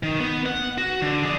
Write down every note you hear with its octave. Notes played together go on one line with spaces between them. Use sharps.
D#3
B3
F#5
F#4
D3
G#4 D5